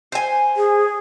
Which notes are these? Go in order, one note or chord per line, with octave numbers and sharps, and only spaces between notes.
C5 G#5
G#4